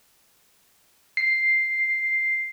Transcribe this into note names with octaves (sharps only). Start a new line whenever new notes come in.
C7